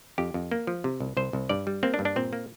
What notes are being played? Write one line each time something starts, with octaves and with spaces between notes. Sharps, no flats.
F2 G4
F2
A#3
F3
C3
C2
C2 C5
C2
G2 D5
G3
A#3 C4
D4
G2
D4
A#2 C4
A#3